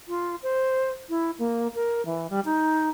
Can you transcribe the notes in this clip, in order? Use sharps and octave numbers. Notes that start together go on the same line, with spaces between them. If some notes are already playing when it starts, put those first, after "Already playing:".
F4
C5
E4
A#3
A#4
E3
G3
D#4